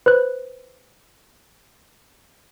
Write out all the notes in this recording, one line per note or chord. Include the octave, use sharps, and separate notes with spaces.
B4 C5 F#6